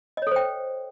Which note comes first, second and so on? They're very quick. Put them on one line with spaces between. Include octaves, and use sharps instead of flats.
D#5 C#5 A4 C5 G5